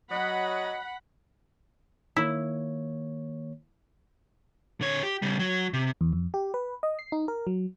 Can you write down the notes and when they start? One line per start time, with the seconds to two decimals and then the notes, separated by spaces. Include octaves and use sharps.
0.10 F#3 D#5 F#5 B5
2.16 D#3 A#3 E4 C#5
4.81 D3 C#5
5.03 G4
5.22 C#3 G3
5.39 F#3
5.73 C3
6.01 E2
6.13 F2
6.34 G4
6.54 B4
6.83 D#5
6.99 C7
7.12 D#4
7.28 A#4
7.47 F#3